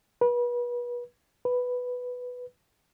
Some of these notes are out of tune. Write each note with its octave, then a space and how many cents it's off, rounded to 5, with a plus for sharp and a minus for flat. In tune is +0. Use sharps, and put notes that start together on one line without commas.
B4 -30
B4 +5